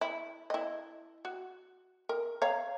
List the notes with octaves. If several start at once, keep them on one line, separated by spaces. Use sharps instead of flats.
E4
E4 D#5
F#4
A#4
C#5 F5 A#5